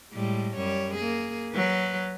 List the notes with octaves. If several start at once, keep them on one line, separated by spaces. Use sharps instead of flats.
A2 G3 G#3
F#2 G3 C#5
A#3 G#4
F#3 B4